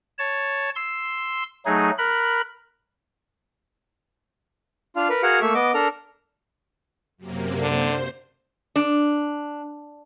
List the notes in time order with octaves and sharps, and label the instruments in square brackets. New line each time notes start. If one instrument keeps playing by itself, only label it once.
[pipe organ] C#5 A5
C6 E6
F#3 A3 D#4 G#4
A#4 B5 F#6
[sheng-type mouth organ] D4 F4 F5
A#4 B4
F#4 G#4 A#4 F5 F#5
A3 A#3 E5 C#6
B3 D#5 D6
D4 A4 A#4 A#5
[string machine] F#2 C3 A#3
[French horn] D3 [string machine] C5
[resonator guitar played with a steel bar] D4